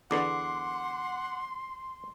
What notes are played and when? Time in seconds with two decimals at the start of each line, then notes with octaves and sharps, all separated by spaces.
0.11 E2 D3 B3 F#5 C6 D6 C7